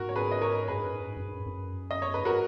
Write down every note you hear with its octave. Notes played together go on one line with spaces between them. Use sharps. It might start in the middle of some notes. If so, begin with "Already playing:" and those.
Already playing: G#2 F#4 A#4
C#5
G#4 B4
D#5
A#4 C#5
F#2 G#4 B4
G#2
F#2
G#2
F#2
G#2
F#2
G#2
F#2
F#2
D#5
C#5
G#2 B4
F#4 A#4